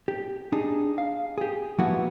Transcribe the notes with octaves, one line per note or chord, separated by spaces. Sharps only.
G4
D4 D#4 G#4
F5
G4 G#4
F3 A#3 B3 E4 F#4